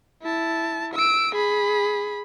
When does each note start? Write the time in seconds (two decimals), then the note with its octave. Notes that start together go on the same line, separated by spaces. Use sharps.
0.22 E4 A5
0.94 E6 D7
1.35 G#4 B5